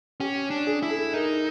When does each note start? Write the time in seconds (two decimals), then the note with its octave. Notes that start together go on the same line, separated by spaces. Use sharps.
0.20 C#4 G4
0.50 D4
0.67 G#4
0.83 E4
0.90 A4
1.13 D#4 A#4